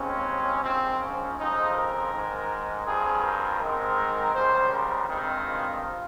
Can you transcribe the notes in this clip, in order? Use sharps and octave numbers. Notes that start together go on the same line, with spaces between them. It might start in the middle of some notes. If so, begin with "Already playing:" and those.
Already playing: D#2 C#3 G#3 C4 C#4
A#1 G#2 F3 C4
C#4
F2 C#3 F3 C4 D#4
A#4
G#2 D#3 G#3
G2 F3 C4 G#4
A#4
G#2 D#3 G#3 C4 A#4
C#2 C#3 G3 C5
A#4
G2 D#3 G#3 C4
F4